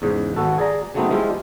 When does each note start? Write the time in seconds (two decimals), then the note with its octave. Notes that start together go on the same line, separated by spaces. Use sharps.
0.02 E2 G#2 C#3
0.36 G#1 B3 F#4 A4
0.58 G#4 D5 A#5
0.94 C#3 F#3 A3 B3 C4 D#4
1.10 F3 G#3 E4 F4 G4